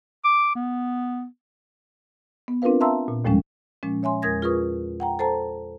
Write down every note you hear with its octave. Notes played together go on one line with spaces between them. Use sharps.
D6
B3
B3
C4 D4 F4 A#4 B4 F5
E5 F5 A5 A#5 C6 E6
A#2
D#2 A2 F3 G3 G#3 C#4
A#2 F3 G#3 C#4
C#5 E5 G#5 C6
E2 G#3 A#4 D#6 G#6 A#6
F4 G#4 A#4 B4 C#6 D#6
F#5 G5 A#5
A4 C5 A5 A#5